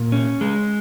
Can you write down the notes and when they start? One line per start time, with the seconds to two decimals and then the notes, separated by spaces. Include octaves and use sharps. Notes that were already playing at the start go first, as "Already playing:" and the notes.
Already playing: A#2
0.12 C#4
0.41 G#3